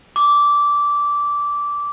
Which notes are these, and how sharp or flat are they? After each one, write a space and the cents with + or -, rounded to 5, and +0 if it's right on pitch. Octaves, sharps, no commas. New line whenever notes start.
D6 -15